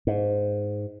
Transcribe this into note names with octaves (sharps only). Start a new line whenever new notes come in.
G#2